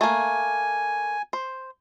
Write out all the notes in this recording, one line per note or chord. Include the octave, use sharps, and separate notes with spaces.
A3 A#3 G#5
C5